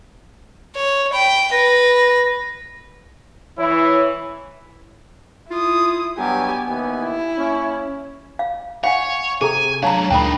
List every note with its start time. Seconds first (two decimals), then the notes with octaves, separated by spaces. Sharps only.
0.75 C#5
1.12 G5 B5
1.52 B4 A#6
3.59 E3 E4 C#5
5.51 E4 F4 D#6
6.18 G2 F#3 B3 G4 G#5
6.68 D#2 E3 B4 G#5
7.03 E4
7.37 A#3 C#4
8.39 F5
8.84 C#5 F5 F#5 G#5
9.41 C3 G#4 A4 G#5 A#5
9.83 F#3 D4 C#5 F5 A5 A#5
10.10 D2 A#2 G#3 D4 D#4 G5 B5